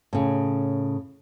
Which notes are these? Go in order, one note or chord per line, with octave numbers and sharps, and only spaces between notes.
A2 C#3